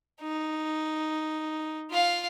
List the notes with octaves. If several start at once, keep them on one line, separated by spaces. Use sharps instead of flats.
D#4
F4 F5